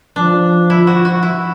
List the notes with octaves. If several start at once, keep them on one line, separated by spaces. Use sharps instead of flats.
F3 D4
E4
F#4
F#4
E4